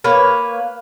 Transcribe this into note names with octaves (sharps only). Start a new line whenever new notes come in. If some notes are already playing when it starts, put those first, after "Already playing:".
A#3 B4 C#5